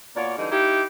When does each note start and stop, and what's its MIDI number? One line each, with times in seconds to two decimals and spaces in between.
0.16 0.35 47
0.16 0.35 58
0.16 0.35 65
0.16 0.35 73
0.16 0.35 74
0.16 0.35 78
0.37 0.49 50
0.37 0.49 52
0.37 0.49 55
0.37 0.49 56
0.37 0.49 63
0.51 0.83 58
0.51 0.83 63
0.51 0.83 64
0.51 0.83 67